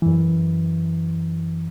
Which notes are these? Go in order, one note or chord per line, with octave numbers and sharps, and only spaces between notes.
F#2 E3